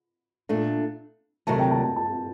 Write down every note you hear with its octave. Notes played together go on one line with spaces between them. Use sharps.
A#2 A3 D4
D2 C3 D#3 F#3 A3 A5
G5
A5
A5
A5